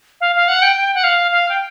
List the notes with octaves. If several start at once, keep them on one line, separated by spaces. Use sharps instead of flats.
F5
F5
F#5
G5
G5
F#5
F5
F5
G5